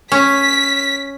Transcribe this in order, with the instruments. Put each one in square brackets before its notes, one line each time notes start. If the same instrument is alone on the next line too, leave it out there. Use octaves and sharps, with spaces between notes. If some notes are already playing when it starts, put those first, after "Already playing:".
[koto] C#4 [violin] B6